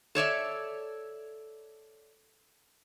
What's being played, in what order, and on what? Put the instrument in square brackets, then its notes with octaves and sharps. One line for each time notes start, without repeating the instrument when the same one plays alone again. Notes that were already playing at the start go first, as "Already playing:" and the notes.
[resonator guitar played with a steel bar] A4 C#5 D5 E5